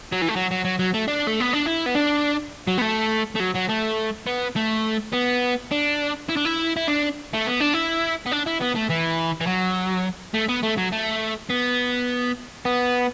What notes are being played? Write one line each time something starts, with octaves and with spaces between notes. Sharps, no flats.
F#3
E3
A3
F#3
F#3
F#3
F#3
A3
D4
A3
B3
D4
E4
B3
D4
F#3
B3
A3
A3
F#3
F#3
A3
B3
A3
B3
D4
E4
D4
E4
E4
D4
A3
B3
D4
E4
B3
D4
E4
B3
A3
E3
E3
F#3
A3
B3
A3
F#3
A3
B3
B3